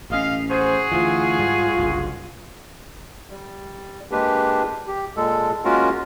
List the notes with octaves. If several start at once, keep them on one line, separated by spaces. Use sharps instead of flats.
A1 C#4 D#5 F5
F#4 G#4 C5
D2 E3 F4
G#2 G3
F#1 C2 G2
G3
G#3 A#3 D4 G4 B4
G4
A#2 G#3 A4
G#3 A#3 C#4 F4 F#4 A#4